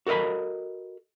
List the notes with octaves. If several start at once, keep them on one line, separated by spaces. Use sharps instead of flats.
F#4 A4 A#4 D#5 B5